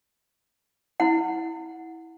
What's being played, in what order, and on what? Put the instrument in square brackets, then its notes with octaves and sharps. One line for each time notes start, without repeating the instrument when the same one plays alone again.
[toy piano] E4 F#5